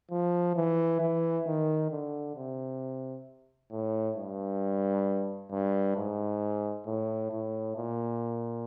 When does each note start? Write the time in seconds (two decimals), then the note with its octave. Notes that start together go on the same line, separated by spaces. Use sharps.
0.11 F3
0.56 E3
1.00 E3
1.46 D#3
1.91 D3
2.36 C3
3.71 A2
4.16 G2
5.51 G2
5.97 G#2
6.86 A2
7.31 A2
7.76 A#2